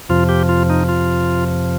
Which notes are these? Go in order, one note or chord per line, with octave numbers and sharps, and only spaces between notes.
F2 C3 F3 F4
G4
F4
D#4
F4